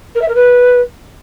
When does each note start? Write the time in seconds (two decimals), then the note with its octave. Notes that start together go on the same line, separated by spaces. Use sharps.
0.15 A#4
0.21 E5
0.28 A#4
0.35 B4